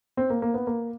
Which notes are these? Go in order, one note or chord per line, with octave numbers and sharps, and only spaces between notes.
C4
A#3
A#3
B3
A#3